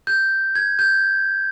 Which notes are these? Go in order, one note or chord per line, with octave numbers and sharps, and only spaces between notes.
G6
G#6
G6